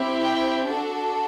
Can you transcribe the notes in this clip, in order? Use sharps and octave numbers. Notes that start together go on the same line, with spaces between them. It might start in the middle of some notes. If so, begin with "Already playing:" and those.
Already playing: C4 E4 G4
G5
D4 F#4 A4